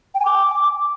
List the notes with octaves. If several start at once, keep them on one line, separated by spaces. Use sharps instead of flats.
G5
G#5
D6